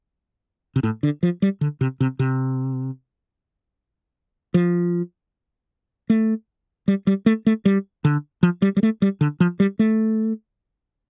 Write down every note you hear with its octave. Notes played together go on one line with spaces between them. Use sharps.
C3
A2
D3
F3
G3
D3
C3
C3
C3
F3
A3
G3
G3
A3
A3
G3
D3
F3
G3
G3
A3
G3
D3
F3
G3
A3